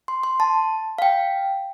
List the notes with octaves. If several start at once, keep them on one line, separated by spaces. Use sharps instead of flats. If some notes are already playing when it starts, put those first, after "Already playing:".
C6
C6
A5
F5
G5